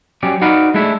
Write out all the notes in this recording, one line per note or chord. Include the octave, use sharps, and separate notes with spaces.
F#3 C#4 G4 D5
D#4 F#4 B4 D5 F5
G#3 A3 D4 E4